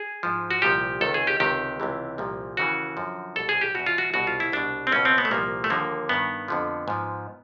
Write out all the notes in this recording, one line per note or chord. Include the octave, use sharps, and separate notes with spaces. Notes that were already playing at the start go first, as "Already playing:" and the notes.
Already playing: G#4
G#2 F3
F#4
C2 A#2 F3 G4
C#2 C3 D#3 A4
G#4
G4
C#2 C3 D#3 G4
C#2 C3 E3
C2 A#2 F3
D#2 C#3 E3 F#4
F#2 D3 F3
C2 B2 A4
G#4
G4
E2 B2 F#4
F4
F#4
C2 B2 F#4
F4
E4
C2 B2 D4
C4
C#2 B2 C#4
C4
B3
A3
C2 A#2 F3 A#3
A3
D#2 D3 F3 A#3
G2 D#3 B3
F2 D3 F3
G#2 F3